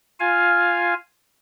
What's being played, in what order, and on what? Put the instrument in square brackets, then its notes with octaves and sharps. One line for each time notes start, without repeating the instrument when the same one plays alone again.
[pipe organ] F4 F5 G#5